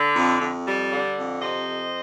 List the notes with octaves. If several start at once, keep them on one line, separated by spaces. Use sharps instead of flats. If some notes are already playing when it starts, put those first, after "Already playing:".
Already playing: D3
F2
F2
G3
D3
F2
C3 C5 D#5
F2